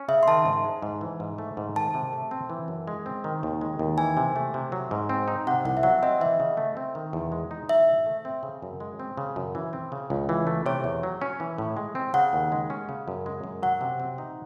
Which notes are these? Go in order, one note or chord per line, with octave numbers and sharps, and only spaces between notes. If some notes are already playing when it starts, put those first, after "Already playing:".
Already playing: C#4
C#3 E5
C6
D#3 A5
G#2
G#3
G#2
E3
G#2
A3
G#2
D#3 A5
C3
A3
C4
E3
F#2
G#3
C4
D#3
D#2
G#3
D#2
E3 G#5
C3
A3
C3
F#3
G#2
C4
D#4
C3 F#5
C2 F#5
E5
F#3 F#5
C4 D#5
E3 E5
C#3
A3
C4
D#3
E2
G#3
D#4
F#3 E5
G#2
A3
C4
C#3
F#2
G#3
C4
C#3
F#2
E3
C4
C#3
C#2
E3
A3
C3 C#5
E2
F#3
C#4
E3
A2
G#3
C4
C#3 F#5
D#2
G#3
C#4
C#3
F#2
G#3
F#2
F#3 F#5
C3
C4
D#4